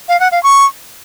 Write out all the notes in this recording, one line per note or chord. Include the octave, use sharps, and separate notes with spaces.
F5
F#5
F5
C#6